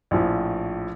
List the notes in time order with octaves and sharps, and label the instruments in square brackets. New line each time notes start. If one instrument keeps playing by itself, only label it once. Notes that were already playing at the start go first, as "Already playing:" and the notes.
[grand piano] A#1 A2 F3